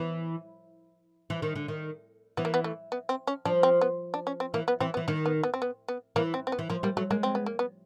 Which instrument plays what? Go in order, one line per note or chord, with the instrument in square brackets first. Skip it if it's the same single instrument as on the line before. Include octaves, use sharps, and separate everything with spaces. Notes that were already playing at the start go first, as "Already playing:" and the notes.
Already playing: [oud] E3 [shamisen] B3
[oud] E3
D#3
D3
D#3
[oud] E3 [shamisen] B3
[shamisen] A#3
B3
A3
B3
C4
C#4
[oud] F3 [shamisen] D4
[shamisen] C4
B3
D4
C#4
C4
[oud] E3 [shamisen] A#3
[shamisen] B3
[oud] E3 [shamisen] C4
[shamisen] B3
[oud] E3
[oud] D#3 [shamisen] A#3
[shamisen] B3
B3
C4
B3
B3
[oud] E3 [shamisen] A#3
[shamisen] C4
C4
B3
[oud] E3
[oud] F3 [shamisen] A#3
[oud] G3 [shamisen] A#3
[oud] F#3 [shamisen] A3
[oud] G#3 [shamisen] A#3
[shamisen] C4
B3
A#3
B3